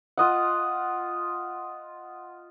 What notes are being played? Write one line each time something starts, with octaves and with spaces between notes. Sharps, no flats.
F4 D#5 F#5